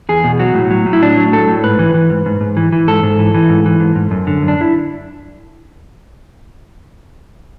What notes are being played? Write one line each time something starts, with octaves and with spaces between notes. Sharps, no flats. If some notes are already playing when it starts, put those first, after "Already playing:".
E2 G#4
B2
F#3 F#4
A2
F#3
A2
E4
F#3 D4
F#3
A2 A4
A2
G#2 B4
E3
E3
G#2
G#2
G#2
E3
E3
G#2 A4
G#2
E3
E3
G#2
E3
G#2
G#2
F#2
D3
F#2
D4
E4